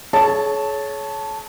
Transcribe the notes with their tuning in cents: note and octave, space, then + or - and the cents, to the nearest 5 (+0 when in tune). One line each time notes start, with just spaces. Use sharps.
G#4 +40 C#5 +5 A5 +0